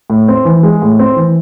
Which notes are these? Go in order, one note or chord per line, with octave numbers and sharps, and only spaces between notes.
A2
C4
E3
G#3
A2
C4
E3